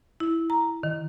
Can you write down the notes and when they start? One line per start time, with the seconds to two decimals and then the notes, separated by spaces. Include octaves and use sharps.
0.20 E4
0.50 A#5
0.83 D#3